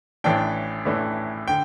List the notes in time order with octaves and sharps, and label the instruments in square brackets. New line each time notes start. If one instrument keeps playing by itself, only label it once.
[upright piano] A1 A2 E3 A3 D4 G5
A1 A2 E3 A3 D4
D3 G5